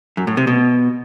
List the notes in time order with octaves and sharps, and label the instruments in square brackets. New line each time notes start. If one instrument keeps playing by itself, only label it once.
[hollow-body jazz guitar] F#2
A2
C3
B2